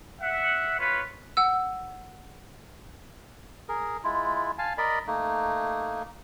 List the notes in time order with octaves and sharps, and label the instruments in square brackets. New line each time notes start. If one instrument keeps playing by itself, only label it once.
[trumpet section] E5 F#5
F4 B4 C#5 B5
[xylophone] F#5 E6
[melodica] G#4 A#4
G#3 E4 F4
F5 G#5 A5
A#4 D5 D#5 B5
A3 A#3 D#4